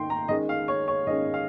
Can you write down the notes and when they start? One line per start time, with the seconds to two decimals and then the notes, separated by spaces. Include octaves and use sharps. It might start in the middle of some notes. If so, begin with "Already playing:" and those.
Already playing: D#3 D#4 G5 C6
0.10 A#5
0.28 D#3 G#3 C#4 D#5
0.49 F5
0.68 C#5
0.88 C#5
1.07 D#3 G#3 C#4 D#5
1.34 F5